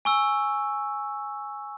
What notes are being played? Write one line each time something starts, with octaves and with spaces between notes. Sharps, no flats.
G#5 C#6 E6